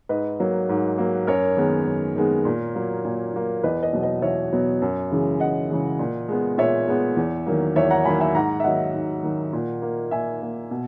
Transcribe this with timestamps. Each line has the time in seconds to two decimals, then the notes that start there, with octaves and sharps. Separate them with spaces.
0.09 G#2 B4 D#5
0.40 F#3 A#3
0.69 G#2
0.98 F#3 A#3
1.27 F#2 A#4 C#5
1.57 D#3 G#3 B3
1.87 F#2
2.16 D#3 G#3 B3
2.45 A#2
2.75 F#3 A#3
3.05 A#2
3.34 F#3 A#3
3.64 E2 B4 D#5
3.83 B4 D#5
3.93 B2 F#3 B3
4.03 B4 D#5
4.22 E2 C#5 E5
4.52 B2 F#3 B3
4.82 F#2
5.11 C#3 E3 G#3
5.40 F#2 D#5 F#5
5.70 C#3 E3 G#3
5.99 A#2
6.29 G#3 B3
6.58 A#2 C#5 E5
6.88 G#3 B3
7.17 E2
7.46 D#3 F#3 A#3
7.76 E2 C#5 E5
7.90 F#5 A#5
8.05 D#3 F#3 A#3 G#5 B5
8.20 E5 G#5
8.34 G#2 F#5 A#5
8.60 E5
8.64 D#3 F#3 D#5 F#5
8.94 G#2
9.23 D#3 F#3
9.53 A#2
9.82 A#3
10.11 A#2 E5 G#5
10.42 A#3
10.71 B2